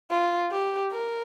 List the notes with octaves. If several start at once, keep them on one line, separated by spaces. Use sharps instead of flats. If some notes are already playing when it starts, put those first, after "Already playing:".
F4
G4
A#4